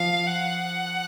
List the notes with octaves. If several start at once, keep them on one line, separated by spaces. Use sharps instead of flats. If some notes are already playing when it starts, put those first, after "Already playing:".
Already playing: F3 F5
F#5